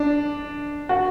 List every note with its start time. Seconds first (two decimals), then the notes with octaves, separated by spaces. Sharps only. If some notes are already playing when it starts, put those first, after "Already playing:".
Already playing: D4
0.89 F#4